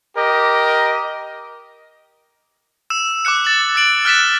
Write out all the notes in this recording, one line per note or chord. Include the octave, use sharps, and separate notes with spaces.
G4 A#4 D#5
E6 E7
D6 E6 F#6 C#7
A6 F#7
E6 A6 D7 F#7
F6 F#6 A6 B6 D7 E7